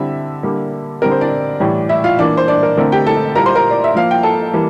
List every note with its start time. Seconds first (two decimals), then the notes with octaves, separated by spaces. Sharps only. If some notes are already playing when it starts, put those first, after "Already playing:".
Already playing: D3 G3 C4 E4 E5
0.43 D3 G3 A#3
1.02 D3 G3 C4 A#4
1.11 C5
1.21 D4 D5
1.60 A2 E3 G3
1.89 E4 E5
2.04 F4 F5
2.19 E3 A#3 D4 D5
2.37 C5
2.48 D4 D5
2.63 A#4
2.77 D3 A3 C4 A#4
2.92 G4 G5
3.07 A4 A5
3.35 A#2 G3 A#3 A#4 A#5
3.46 C5 C6
3.55 A#4 A#5
3.71 D5
3.84 E5
3.95 A#2 F3 A#3 F5
4.11 G5
4.23 A4 A5
4.53 E3 G3 A#3